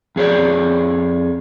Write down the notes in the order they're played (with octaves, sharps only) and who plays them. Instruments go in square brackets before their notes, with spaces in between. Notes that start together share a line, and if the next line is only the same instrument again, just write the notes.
[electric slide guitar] F2 G#4 C#5 D5